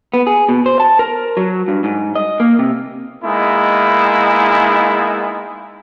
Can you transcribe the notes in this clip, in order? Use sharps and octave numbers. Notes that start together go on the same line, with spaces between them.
B3
G#4
B2
C5
A5
A#4
F#3
G2
G#2
D#5
A#3
C3
G#3 A#3 B3 D#4 E4